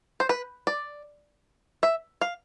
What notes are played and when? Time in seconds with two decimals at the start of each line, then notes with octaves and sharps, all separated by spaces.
0.20 C5
0.29 B4
0.67 D5
1.83 E5
2.21 F5